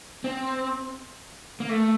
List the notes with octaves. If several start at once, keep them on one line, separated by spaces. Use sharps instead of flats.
C4
A#3
A3